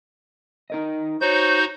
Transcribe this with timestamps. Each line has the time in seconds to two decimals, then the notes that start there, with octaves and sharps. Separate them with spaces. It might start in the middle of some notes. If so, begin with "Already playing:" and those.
0.70 D#4 A#4 D#5
1.21 D#4 F#4 C5 C#5 G6